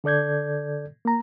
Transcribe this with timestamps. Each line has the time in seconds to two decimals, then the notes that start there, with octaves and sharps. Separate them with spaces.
0.04 D3 A4 D5 G6 G#6
1.05 A#3 A#5